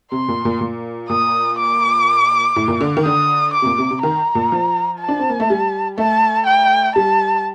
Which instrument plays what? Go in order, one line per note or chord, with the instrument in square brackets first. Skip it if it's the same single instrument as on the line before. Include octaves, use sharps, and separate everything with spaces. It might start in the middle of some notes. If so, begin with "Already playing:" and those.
[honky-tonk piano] C3 [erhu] C6
[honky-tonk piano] A#2
A#2
A#2
[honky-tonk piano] A#2 [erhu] D#6
[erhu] D6
[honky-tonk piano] A2
A#2
D3
D#3
[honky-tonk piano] D3 [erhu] D#6
[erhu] D6
[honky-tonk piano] C3
A#2
C3
C3
[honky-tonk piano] D#3 [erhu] A#5
[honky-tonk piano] A#2
F3
[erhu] A5
[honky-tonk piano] D4
C4
A#3
A3
G3
[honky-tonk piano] A3 [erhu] A5
[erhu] G5
[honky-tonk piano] G3 [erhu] A5